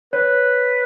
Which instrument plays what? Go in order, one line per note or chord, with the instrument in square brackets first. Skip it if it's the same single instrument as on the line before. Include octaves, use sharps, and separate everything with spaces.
[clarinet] B4 [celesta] C#5